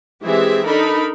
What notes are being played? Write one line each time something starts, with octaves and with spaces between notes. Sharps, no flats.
E3 G#3 C4 G4 G#4 E5
D4 D#4 A4 A#4 B5